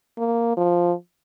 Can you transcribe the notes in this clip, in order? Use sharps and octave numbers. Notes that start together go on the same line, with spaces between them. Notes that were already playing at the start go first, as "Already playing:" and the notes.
A#3
F3